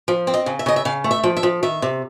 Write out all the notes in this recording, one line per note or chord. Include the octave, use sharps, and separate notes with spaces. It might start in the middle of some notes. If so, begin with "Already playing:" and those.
F3
C4
D#5
C#3
E5
C#3 D#5
E5
C#3 F5
A3
E5
F3
E5
F3
D#3 E5
C3